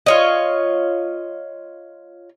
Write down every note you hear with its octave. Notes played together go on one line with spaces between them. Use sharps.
F4 C#5 D#5